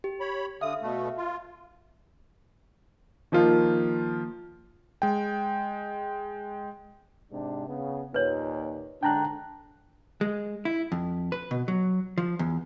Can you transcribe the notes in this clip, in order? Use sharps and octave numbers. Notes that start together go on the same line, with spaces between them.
G4
C#5 B5
D3 E5 F5 D#6
B2 A3
F4
D#3 F3 A#3 F4
G#3 G5
G#2 C3 D4
C#3 B3
D#2 A#2 B4 C#5
G#2 D3 D4 G5 A#5 F#6
G#3
E4
F2
B4
B2
F#3
F3
E2